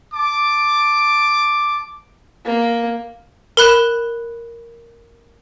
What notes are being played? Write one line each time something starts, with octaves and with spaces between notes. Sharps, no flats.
A5 D6
A#3
A#4 B5 F#6 E7